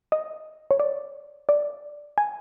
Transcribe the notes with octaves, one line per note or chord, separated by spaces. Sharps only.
D#5
C#5
D5
D5
G#5